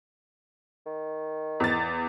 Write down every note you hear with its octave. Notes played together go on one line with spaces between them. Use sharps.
D#3
E2 A6